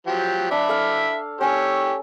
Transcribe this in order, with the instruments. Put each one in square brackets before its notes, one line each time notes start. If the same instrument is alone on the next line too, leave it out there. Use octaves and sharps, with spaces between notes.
[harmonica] F3 F#3 G4
[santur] D4 [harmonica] E5 B5 D6
[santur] A4 F5
[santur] C#4 E6 [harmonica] G4 C#5